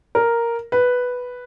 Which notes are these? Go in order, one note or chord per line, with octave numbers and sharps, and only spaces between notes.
A#4
B4